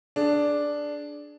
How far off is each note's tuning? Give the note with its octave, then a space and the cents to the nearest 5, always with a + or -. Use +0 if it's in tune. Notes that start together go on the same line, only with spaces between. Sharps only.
D4 +0 G#4 +15